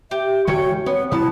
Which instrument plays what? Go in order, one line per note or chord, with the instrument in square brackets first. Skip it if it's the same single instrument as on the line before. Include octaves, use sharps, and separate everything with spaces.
[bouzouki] G4 [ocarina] E5
[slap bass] D#1 D3 E3 [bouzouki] C#4 C#5 G5 [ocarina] F#4
[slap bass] E3 G#3
[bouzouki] B3 [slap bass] C4 [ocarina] C#5
[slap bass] C3 D#3 G3 [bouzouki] E3 B3 A5 [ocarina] E4